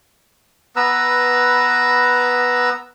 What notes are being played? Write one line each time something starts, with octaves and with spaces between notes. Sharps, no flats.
B3 B4 A#5 E6